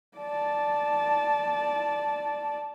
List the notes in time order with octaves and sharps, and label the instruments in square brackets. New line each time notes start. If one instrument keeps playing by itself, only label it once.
[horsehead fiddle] D5 A5